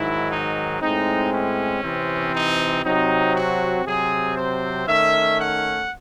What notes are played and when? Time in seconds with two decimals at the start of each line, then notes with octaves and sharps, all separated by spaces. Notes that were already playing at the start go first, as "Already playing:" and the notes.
Already playing: G#2 D#3 F#3 E4
0.30 D#4
0.81 A2 G#3 C4 D#4
1.32 C#4
1.82 C3 E3 C4
2.34 D#4
2.83 C3 F#3 C4 D#4
3.35 F#4
3.85 C3 F#3 C4 G#4
4.36 C5
4.87 D#3 A3 C#4 E5
5.38 F#5